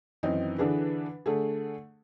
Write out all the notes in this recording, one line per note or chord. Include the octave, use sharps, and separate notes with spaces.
F#2 D#3 E3 C4 D#4
D3 E3 D4 G#4 B4
D3 A3 G#4